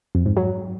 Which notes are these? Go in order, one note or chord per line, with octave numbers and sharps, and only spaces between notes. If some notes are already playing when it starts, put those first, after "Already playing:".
F2
G#2
F#3